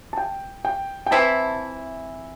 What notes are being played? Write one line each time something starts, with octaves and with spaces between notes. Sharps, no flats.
A5
G5
G5
G5
E3 C4 E4 A5